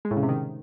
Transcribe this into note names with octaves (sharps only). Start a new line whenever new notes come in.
G#3
A2
C#3
C3
D#3